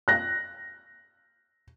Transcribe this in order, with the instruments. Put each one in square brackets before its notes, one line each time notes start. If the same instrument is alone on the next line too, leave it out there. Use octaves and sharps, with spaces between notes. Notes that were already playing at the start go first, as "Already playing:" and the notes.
[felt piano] F#6 A#6